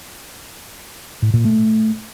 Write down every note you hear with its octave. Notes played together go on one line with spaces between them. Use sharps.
A2
A#2
A3